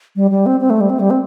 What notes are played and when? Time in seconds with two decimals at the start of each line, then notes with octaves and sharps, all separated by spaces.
0.16 G3
0.31 G3
0.46 C4
0.61 C4
0.70 A3
0.81 G3
0.90 C4
1.00 G3
1.10 C4